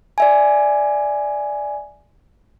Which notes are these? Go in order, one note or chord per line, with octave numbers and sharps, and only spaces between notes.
D5 E5 G#5